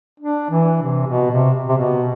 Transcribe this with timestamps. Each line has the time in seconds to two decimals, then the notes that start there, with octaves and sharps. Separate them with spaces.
0.20 D4
0.51 E3
0.82 C3
1.07 B2
1.31 C3
1.69 C3
1.77 B2